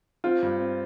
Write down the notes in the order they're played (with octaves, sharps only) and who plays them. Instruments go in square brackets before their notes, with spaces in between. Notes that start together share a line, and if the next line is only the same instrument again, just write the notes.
[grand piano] C4 [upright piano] F4
[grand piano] G2
C4